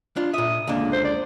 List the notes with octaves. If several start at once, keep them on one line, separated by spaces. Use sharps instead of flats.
D4 F4
A#2 E5 D#6
C#2 D3 A#3 D4
C5
D5